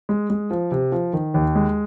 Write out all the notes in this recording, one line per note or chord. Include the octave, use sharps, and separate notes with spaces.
G#3
G#3
F3
C3
F3
D#3
D#2
G#3